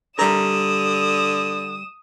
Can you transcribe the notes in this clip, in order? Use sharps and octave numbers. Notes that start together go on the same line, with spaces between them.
D3 G3 A#4 D#6 E7